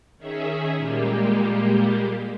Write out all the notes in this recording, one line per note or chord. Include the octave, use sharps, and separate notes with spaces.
D#3 C#4 G#4 E5
A#2 G3 G#3 A#3 G4